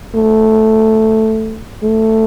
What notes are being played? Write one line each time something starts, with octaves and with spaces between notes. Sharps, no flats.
A3
A3